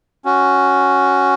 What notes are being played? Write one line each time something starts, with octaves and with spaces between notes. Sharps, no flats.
C#4 F#4